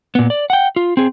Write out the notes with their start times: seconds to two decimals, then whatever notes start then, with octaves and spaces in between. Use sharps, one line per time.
0.15 A#2 B3
0.30 D5
0.50 F#5 G5
0.76 F4
0.97 C4 G#4